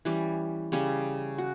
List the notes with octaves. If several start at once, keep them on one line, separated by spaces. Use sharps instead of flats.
E3 G3 C#4
C#3 G3 C#4
F#4